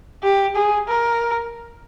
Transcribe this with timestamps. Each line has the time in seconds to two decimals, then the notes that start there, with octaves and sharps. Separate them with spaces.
0.23 G4
0.56 G#4
0.88 A#4